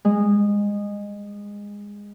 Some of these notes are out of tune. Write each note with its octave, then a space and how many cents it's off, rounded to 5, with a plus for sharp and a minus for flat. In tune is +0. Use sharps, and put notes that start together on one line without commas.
G#3 -20